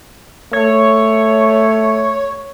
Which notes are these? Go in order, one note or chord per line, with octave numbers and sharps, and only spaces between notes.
A3 C#5